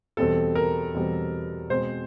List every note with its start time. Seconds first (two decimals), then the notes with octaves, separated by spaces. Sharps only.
0.17 E2 B2 G3 C4 A4
0.55 A#4
0.94 E2 B2 G3 C4
1.70 B2 G#3 C4 C5